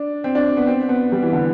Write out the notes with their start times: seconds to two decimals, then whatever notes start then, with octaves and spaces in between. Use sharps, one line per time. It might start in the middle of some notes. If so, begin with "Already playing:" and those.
Already playing: D4
0.24 C4
0.35 D4
0.57 B3
0.67 C4
0.89 B3
1.12 G3
1.22 E3
1.33 D3